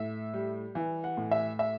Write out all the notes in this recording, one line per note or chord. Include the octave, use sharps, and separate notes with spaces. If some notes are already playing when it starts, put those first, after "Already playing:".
Already playing: A2 E5
G3
E3
F#5
A2
E5
E5